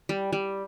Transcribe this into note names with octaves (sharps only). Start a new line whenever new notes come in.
G3
G3